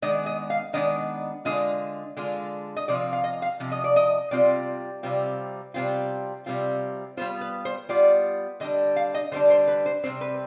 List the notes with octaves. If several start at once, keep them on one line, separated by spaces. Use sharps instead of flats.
D#3 G#3 B3 D4 D#5
D#5
F5
D#3 G#3 B3 D4 D#5
D3 G#3 D4 F4 D#5
D3 G#3 D4 F4
D#5
C3 F3 C4 F4 D5
F5
D#5
F5
C3 F3
D#5
D5
D#5
C3 G3 C4 F4 D5
C3 G3 C4 F4
C3 G3 C4 F4
C3 G3 C4 F4
G3 B3 F4 C5
B4
C5
G3 B3 F4 D5
D3 G3 D4 D#5
F5
D#5
D3 G3 D4 C5
C5
B4
C5
C3 D#3 G3 C4 C5
B4